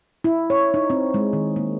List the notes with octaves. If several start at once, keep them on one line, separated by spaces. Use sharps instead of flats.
E4
C#5
D#4
C4
G#3
D#3
A#3